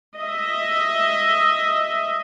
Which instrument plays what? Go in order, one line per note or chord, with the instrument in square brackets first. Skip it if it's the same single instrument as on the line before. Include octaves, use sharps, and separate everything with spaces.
[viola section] D#5 E5